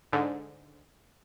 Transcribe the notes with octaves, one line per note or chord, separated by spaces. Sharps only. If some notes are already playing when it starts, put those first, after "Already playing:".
G#2 D3